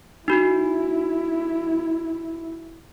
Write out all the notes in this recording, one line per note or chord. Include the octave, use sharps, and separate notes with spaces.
D#4 E4 F#4